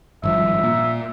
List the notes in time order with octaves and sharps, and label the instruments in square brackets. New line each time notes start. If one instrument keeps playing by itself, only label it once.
[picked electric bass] G#1 G2 F3 [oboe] E5
[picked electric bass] A#2